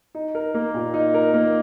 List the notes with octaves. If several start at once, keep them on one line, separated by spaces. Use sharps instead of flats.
D#4
A#4
A#3
A#2
D#4
A#4
A#3